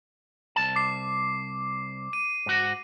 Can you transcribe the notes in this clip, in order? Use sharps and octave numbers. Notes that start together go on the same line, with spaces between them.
C2 A5
D6 C7
D#7
G#2 F#4